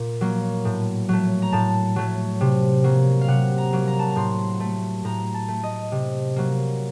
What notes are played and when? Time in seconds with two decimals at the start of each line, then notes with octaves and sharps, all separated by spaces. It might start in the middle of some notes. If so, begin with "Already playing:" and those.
Already playing: A#2
0.21 F#3 A#3
0.65 A2
1.09 F#3 A3
1.42 A#5
1.52 A2 A5
1.96 F#3 A3
2.41 C3
2.84 F#3 A#3
3.21 F5
3.28 C3 F#5
3.58 A#5
3.73 F#3 A#3
3.87 A#5
3.99 A5
4.08 A#5
4.16 A2 C6
4.60 A3
5.05 A2 A#5
5.34 A5
5.48 A3
5.63 D#5
5.92 C3
6.36 F#3 A#3